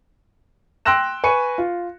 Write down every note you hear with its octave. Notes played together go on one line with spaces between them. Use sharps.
G5 C6 E6 F#6 A#6 E7
B4 G#5 C#6 C#7
F4